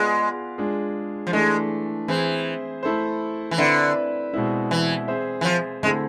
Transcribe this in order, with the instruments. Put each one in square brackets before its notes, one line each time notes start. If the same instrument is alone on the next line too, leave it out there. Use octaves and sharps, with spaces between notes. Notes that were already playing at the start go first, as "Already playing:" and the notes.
Already playing: [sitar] G#3 [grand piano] B3 F4 B4 D5 F5
[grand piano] G#3 D4 F4 G#4
[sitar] F3
[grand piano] E3 A3 D4 [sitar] G#3
[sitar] E3 [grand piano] C4 G#4 C5
[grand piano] A3 E4 A4 C5
[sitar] E3
[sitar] D3 [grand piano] C4 E4 B4 E5
[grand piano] B2 G#3 C4 E4
[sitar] E3
[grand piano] C4 G#4 C5 E5
[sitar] E3
F3
[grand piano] D3 A3 C4 E4 A4 [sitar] G#3